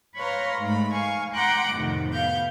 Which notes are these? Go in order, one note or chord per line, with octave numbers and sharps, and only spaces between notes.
B4 C#5 F5 A#5 C6
G#2 A3 B5
F5 G#5 C#6
F#5 G5 A#5 C6 D6 F#6
F2 A2 C3 D#3
B3 F5 G6